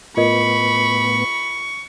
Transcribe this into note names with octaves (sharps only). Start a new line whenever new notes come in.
A2 B3 F4 A#4 D#5 B5 C#6